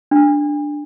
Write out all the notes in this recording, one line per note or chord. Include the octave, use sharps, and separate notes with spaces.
D4